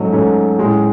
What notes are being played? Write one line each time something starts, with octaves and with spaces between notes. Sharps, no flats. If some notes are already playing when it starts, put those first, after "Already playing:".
Already playing: G#2 F#3 A3 C#4 D#5
G#2 F#3 A3 C#4
A2 G#3 C#4